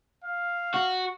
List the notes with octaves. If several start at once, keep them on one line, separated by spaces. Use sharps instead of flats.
F5
F#4